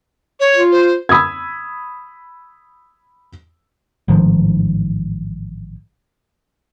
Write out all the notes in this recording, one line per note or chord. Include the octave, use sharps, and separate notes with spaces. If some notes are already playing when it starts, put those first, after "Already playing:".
C#5
F4
C5
B5 D#6 E6 G#6
A1 G#2 D#3 F3